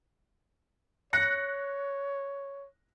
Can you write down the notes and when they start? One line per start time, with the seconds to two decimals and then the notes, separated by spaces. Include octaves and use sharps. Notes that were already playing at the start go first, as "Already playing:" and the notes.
1.13 C#5 F#6 A#6 C#7